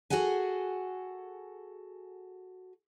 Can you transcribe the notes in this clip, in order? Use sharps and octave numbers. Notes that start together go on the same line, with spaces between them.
F#4 G#4 A4 F#5 G#5